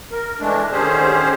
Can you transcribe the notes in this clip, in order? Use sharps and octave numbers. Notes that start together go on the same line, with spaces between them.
A#4
E3 G#3 A3 D4
D3 D#3 C#4 G4 G#4 C5